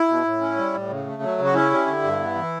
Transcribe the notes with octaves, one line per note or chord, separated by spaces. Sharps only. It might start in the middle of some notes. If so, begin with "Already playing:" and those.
Already playing: E4
B2
A2
C#4
G3
A2
C#3
A3
F#3
C#3
F#4
C#4 E4
G3
D3
G2
B3
E3